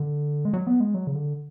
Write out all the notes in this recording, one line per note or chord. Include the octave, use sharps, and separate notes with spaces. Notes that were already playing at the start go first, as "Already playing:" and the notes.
Already playing: D3
G#3
F#3
B3
G#3
F#3
C#3
D3